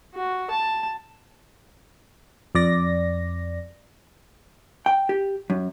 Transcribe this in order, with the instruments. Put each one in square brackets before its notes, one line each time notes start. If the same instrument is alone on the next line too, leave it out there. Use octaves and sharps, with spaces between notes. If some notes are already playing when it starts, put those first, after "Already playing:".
[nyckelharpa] F#4
A5
[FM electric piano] F2 D5 A#6
[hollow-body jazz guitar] G5
G4
F#2